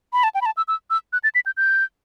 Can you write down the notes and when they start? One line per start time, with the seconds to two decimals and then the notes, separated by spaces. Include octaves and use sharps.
0.13 B5
0.24 A5
0.35 G5
0.42 B5
0.46 A5
0.57 E6
0.68 E6
0.90 E6
1.13 F#6
1.24 A6
1.35 B6
1.46 G6
1.57 G6